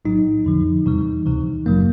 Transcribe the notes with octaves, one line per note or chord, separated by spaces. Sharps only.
A#1 A2 F#3 D#4
F2 D3 F3
E2 C3 E3 G3
D2 C3 E3
G1 F#2 C#3 F#3 A#3